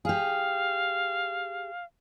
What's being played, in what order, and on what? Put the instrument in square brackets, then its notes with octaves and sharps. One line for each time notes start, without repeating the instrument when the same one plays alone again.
[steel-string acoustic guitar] G4 G#4 [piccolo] F5